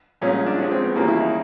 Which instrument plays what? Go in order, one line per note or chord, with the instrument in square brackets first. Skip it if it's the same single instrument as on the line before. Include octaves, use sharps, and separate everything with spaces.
[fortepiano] C2 A#2 F3 G#3 C#4
C#4
D4
A2 F3 G#3 C#4
C4
B3
D#2 C#3 E3 G3 A#3
E4
D#4